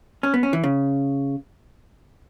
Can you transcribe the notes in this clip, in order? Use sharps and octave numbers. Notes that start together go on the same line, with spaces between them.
C#4
B3
C#4
E3
C#3